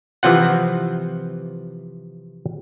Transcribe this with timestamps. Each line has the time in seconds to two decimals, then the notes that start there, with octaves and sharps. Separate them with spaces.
0.23 C3 E3 F3 C4 F4 F#5